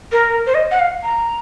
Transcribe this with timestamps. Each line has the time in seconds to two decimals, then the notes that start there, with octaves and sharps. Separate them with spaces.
0.12 A#4
0.47 C5
0.55 D#5
0.71 F#5
0.80 F5
1.03 A#5